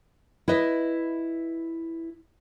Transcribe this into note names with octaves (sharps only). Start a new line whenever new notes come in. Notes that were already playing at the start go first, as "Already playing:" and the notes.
E4 B4 D#5 E5